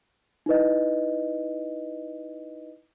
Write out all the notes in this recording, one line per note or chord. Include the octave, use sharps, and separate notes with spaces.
D#4 E4 B4 D#5